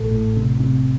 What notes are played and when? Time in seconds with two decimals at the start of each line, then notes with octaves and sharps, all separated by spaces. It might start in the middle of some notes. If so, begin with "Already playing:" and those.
Already playing: A1 A2 A4
0.11 A2
0.37 C3
0.60 C3